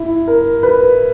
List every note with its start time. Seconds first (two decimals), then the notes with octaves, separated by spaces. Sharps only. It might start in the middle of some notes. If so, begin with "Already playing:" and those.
Already playing: E4
0.28 A#4
0.63 B4